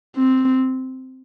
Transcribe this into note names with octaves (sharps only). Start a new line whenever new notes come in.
C4